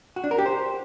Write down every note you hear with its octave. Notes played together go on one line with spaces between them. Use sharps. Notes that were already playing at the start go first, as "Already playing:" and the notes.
F#4
D4
A#4
G4
C5